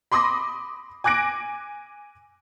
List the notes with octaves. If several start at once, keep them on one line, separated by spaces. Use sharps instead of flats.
B5 C6 D6 D#6 A#6
G#5 D6 F#6 A#6 D7